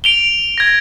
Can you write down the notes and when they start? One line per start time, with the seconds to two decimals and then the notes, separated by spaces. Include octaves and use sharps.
0.04 D7 F7 G7
0.58 G#6 A#6